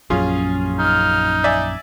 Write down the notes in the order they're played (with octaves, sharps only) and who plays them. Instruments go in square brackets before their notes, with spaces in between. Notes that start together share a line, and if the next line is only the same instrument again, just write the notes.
[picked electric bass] A#1 F#2 [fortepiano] C#4 F4 G#4
[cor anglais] D#4 [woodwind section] F6
[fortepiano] D5 E5 G#5